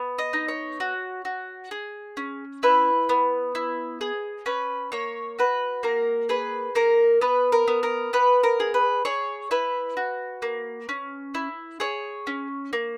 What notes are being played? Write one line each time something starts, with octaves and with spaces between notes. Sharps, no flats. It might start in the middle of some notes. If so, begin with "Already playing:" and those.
Already playing: B3
D#5
D#4
C#5
F#4
F#4
G#4
C#4
E4 B4
B3
E4
G#4
C#4 B4
A#3 C#5
F#4 B4
A#3 A#4
G#4 B4
A#3 A#4
B3 B4
A#4
B3
A#4
B3 B4
A#4
G#4
B4
G#4 C#5
E4 B4
F#4
A#3
C#4
E4
G#4 C#5
C#4
A#3